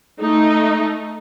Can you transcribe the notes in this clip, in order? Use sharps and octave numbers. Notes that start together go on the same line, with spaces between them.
A3 D#4